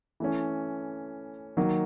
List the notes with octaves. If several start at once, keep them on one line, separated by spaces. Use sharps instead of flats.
E3 A3 C#4
D#3 F#3 A#3